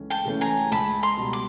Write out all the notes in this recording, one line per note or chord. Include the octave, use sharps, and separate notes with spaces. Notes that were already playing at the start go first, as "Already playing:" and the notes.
Already playing: C#2 E3 A3 C#4
G5 A5
C#3 E3 A3 C#4
G#5 A#5
C#2 A5 B5
A#5 C6
B2 G3
D6